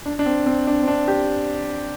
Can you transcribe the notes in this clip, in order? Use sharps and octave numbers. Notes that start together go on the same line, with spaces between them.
D4
D4
C4
C4
D4
C4
D4
G4